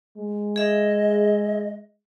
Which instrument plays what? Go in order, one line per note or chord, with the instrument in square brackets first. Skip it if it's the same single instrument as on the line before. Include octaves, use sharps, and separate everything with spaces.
[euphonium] G#3
[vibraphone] G#4 E5 [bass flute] D#5